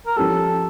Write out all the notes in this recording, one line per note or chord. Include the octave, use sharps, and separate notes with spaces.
A#4
F3 C#4 G4 A4